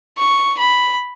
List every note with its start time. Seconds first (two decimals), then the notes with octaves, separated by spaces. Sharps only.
0.18 C#6
0.59 B5